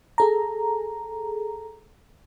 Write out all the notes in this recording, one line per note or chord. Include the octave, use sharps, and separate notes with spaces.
G#4 A4 A#5